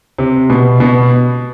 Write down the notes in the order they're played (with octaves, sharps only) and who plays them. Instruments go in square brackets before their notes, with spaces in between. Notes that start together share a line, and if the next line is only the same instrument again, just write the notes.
[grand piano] C3
B2
B2